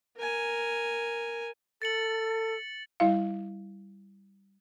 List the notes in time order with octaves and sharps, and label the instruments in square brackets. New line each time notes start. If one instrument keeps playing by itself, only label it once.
[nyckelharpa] A#4 G#5
[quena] A4 [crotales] A6 C#7 F#7
[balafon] G3 E4 F5